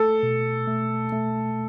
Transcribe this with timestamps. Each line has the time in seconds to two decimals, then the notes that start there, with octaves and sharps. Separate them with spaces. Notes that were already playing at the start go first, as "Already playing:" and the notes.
Already playing: A3 A4
0.23 B2
0.68 A3
1.12 A3